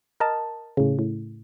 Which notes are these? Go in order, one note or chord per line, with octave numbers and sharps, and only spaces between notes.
A#4 D#5 A5
A2 C#3
A2